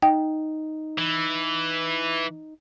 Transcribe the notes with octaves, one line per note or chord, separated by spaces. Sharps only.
D#4 G5
E3